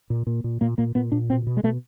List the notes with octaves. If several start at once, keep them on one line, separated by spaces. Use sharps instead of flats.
A#2
A#2
A#2
A#2 A#3
A#2 A#3
A#2 B3
A#2 D4
B2 C4
B2
G#3
B2 A3